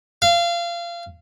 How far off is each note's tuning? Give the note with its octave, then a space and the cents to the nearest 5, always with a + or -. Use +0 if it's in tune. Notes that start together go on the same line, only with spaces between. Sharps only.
F5 -25